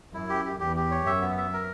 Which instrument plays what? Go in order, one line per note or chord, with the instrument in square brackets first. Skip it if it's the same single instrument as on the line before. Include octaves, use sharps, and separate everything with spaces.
[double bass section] F#2 [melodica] E4
[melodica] G4
G4
[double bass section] E2 [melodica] G4
[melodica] G4
C#5
[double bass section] F#2 [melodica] E5
[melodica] B3
E5
A#4